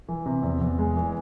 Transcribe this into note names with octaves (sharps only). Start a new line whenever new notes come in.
E3
C3
E2
E2
G#3
E3